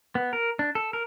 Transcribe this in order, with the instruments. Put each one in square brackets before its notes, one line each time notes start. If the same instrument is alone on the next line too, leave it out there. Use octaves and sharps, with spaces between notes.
[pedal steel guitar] B3
A#4
D4
A4
A#4